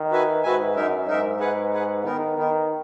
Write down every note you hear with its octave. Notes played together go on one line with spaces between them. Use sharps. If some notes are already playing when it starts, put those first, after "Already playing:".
Already playing: D#3
F#4 B4 E5 G#5
G#2 F#4 B4 E5 G#5
F#2 D#4 A#4 E5
G#2 D#4 A#4 E5
G#4 B4 F#5
G#4 B4 F#5
D#3 B3 D#4 A#4
D#3 B3 D#4 A#4